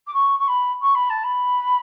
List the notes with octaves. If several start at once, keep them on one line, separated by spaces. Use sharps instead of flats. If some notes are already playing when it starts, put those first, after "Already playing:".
D6
C#6
C#6
B5
C#6
B5
A5
B5